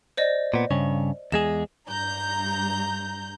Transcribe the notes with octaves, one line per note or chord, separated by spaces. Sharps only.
C5 D5 D#5
A#2 B3
G2 C#3 C#5
E2 G#3 G#4 E7
G2 A#5 G6